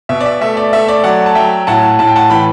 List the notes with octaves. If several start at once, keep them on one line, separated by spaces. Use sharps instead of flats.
B2 E5
D5
E5
A3 E5
D5
A3 E5
D5
F#3 D5 F#5
A5
F#3 E5 G5
A2 F#5 A5
A2 A5
G5
F#5 A5
E3 G5 B5